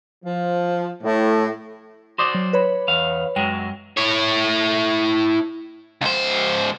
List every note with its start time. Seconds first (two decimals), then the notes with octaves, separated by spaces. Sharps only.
0.24 F3
1.03 A2
2.18 F#4 C5 D5 C6 D6 D#6
2.34 F#3
2.53 B4 C#5 B5
2.88 E2 F5
3.36 F#2 F#3 G#3 G5
3.97 E4 C#5
6.01 C#2 C5